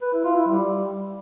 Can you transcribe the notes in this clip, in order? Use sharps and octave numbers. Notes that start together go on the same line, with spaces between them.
B4
E4
F4
E4
G3